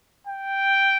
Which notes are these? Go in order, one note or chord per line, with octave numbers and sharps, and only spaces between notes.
G5